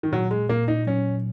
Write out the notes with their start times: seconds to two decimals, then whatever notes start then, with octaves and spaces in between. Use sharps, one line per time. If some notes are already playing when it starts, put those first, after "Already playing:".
0.03 D#3
0.12 A#2 F#3
0.31 G#3
0.49 A#2 A#3
0.68 D#4
0.87 F#3 C#4